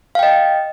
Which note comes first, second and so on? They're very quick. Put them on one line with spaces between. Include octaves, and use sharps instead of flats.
F5 G5 D#5